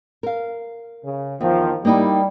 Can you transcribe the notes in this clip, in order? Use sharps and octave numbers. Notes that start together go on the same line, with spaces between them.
A#4 F5
C#3
E2 D#3 F3
G3 A#3 D#4 E4